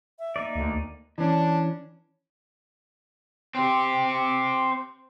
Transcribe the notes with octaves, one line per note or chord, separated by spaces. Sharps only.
E5
A#3 D#4 D5
D2
E3 C#4 D4
C4 G4